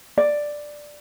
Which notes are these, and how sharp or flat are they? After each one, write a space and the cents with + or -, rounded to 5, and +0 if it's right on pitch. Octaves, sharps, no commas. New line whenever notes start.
D5 +5